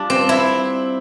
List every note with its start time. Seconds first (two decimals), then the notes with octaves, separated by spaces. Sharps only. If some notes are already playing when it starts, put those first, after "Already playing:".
Already playing: G3 D4 F4
0.10 C4
0.29 E4